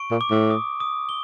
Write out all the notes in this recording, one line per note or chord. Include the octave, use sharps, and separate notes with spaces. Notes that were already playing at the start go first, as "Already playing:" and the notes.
Already playing: C#6 D7
A#2
D6
A2
D#6
D#6
G7